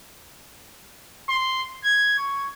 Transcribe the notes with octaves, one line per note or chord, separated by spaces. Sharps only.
C6
G#6
C#6